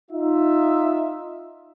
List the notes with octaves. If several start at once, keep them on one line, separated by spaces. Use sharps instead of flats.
D#4 F4 E5